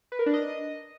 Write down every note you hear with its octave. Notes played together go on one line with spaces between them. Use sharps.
B4
A#4
D4
D#5